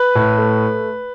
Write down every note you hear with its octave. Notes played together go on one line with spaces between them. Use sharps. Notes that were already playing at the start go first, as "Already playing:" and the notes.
Already playing: B4
A2
A3